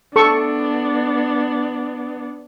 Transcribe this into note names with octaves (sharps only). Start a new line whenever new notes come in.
B3 D4 A4 C#6